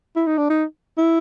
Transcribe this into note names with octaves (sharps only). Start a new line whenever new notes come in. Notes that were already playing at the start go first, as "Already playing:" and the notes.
E4
D#4
D4
D#4
E4